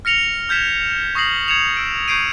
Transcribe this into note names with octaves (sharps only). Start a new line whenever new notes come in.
F6 A#6 C#7 F7 G7
F6 G6 G#6 B6 E7
C#6 D#6 A#6 C7 F#7
G#6 C#7 E7 F7
E6 D7
C#6 G6 G#6 C7 D7 D#7